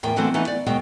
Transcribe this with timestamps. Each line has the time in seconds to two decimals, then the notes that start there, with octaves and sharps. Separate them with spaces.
0.03 E2 A2 A#4 G5
0.16 D3 E3 F#3 A3 B3 C4
0.34 E3 A3 B3 D#4
0.47 D5
0.66 D#2 B2 F#3 G#3 G5